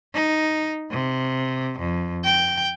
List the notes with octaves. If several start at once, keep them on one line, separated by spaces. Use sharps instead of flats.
D#4
C3
F2
G5